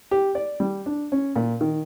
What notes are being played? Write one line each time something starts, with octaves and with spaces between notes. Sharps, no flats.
G4
D5
G3
D4
C#4
A#2
D#3